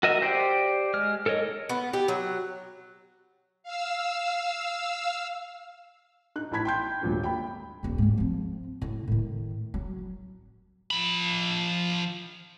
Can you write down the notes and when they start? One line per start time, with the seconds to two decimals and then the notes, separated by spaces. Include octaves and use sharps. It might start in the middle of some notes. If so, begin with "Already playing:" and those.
0.03 F#4 A#4 D#5 E5
0.22 G4 C5 D5
0.94 G#3 F6
1.26 A4 A#4 C#5 D#5
1.69 B3
1.93 G4
2.08 F#3
3.63 F5 E6
6.36 D#4 F#6
6.51 A1 A2 A5 B5 G#6 B6
6.65 G5 C6 G6
7.01 D#1 G#1 A#2 D3
7.23 G5 B5
7.83 D#1 A#1
7.98 G#2 A3
8.18 F3 C4
8.82 A2
9.08 A2 D#3
9.74 F#3
10.91 F3 B5